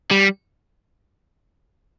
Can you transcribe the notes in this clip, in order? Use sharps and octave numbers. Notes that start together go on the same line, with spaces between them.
G3